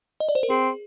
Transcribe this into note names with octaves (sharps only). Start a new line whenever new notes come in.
D#5
D5
C5
A#4
C4 G#4